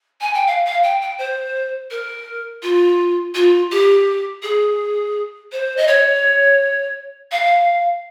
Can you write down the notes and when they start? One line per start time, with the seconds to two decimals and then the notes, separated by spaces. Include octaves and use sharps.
0.21 G#5
0.34 G5
0.47 F5
0.65 F5
0.83 G5
1.01 G5
1.18 C5
1.91 A#4
2.63 F4
3.35 F4
3.72 G4
4.43 G#4
5.52 C5
5.77 D#5
5.88 C#5
7.32 F5